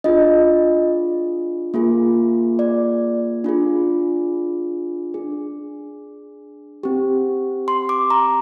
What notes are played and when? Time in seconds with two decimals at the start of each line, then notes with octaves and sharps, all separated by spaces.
0.04 D4 F4 G#4 D#5
1.74 A#3 F4 G#4
2.59 D5
3.44 D4 F4 G#4
5.14 D4 G#4
6.83 C4 G4
7.68 C6
7.89 D6
8.10 A#5